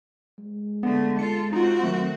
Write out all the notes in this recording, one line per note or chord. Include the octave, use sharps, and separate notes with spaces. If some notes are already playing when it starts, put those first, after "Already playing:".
G#3
D3 A3 B3
F4 A4 C#7
C4 D#4 F4 F#4
D#3 F#3 A3